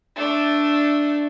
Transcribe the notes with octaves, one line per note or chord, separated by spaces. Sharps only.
A3 D4